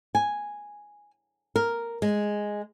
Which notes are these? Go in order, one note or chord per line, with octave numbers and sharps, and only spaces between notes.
G#5
A#4
G#3